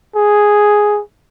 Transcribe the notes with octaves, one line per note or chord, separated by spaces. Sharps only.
G#4